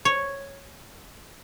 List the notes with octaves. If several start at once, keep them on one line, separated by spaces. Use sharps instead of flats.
C#5